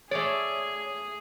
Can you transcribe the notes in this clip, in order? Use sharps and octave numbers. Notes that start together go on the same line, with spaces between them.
A3 G#4 C#5 D5